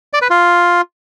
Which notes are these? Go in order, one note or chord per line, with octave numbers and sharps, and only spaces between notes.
D5
B4
F4